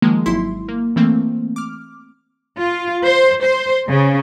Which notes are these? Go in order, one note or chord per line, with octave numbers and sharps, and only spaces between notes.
D#3 F3 G#3 A#3
G#1 F#3 E4 C6
A#3
E3 A3 A#3 C4
D6 F6
F4
C5
C5
C#3